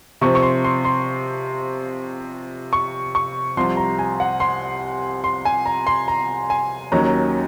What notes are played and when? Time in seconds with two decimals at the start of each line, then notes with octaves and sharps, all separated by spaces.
0.21 C3 F3 C4 C#6
0.35 C#6
0.42 C6
0.64 C6
0.85 C6
2.73 C#6
3.15 C#6
3.57 C2 C3 F3 C6
3.77 A#5
3.99 G#5
4.20 F#5
4.40 C6
5.24 C6
5.45 G#5
5.66 A#5
5.87 C6
6.08 A#5
6.50 G#5
6.92 D#2 D#3 F#3 C#4 A#5